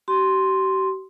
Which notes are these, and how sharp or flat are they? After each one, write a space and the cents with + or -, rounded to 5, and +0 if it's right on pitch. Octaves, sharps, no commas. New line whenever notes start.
G4 -45 C6 +0